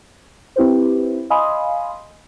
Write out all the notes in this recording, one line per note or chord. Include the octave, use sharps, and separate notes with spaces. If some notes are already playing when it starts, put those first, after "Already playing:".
C4 E4 G4 B4 C5
D#5 F5 G#5 B5 C6 D#6